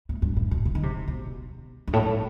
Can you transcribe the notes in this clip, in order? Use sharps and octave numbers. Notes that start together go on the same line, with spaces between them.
A2
G2
A2
B2
C3
D#3
C3
B2
G2
A2
G2